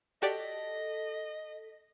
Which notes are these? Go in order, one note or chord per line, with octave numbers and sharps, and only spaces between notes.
F#4 G4 A4 D5 D#5 B6